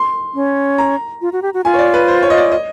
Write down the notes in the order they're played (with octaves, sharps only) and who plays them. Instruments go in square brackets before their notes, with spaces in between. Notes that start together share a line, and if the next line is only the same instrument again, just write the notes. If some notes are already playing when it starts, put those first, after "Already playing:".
Already playing: [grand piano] C6
[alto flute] C#4
[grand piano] A#5
[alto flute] F4
F#4
G4
F#4
[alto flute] F4 [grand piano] G#5
[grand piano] C#5
D5
B4
C5
C#5
D#5
D5
D#5